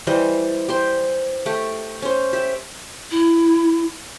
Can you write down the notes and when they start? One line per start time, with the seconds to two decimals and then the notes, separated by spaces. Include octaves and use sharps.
0.07 E3 G3 C5 D#5
0.68 G4 C5 C6
1.46 A3 G4
2.02 C#4 C5
2.33 G4 E5
3.11 E4